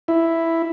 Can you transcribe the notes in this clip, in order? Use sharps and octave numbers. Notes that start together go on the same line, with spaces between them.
E4